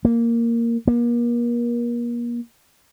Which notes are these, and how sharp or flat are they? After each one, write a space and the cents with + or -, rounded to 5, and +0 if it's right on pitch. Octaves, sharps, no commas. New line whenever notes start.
A#3 -5
A#3 +35